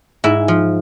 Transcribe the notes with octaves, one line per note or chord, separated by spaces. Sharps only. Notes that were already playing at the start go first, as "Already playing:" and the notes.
G#2 E4
F3